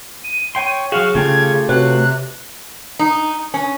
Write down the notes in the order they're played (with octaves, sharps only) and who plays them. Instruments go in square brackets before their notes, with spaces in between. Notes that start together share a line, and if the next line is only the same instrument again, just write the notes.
[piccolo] D#7
[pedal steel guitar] C#5 G5 C6
[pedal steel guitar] F#3 F#4 [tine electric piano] G#4 [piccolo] F5
[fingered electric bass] C#3 [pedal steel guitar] A3 F4 G4 [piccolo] G#6
[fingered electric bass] C3 [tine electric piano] F#4 B4 C#5 [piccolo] F#6
[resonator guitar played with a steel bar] D#4
C#4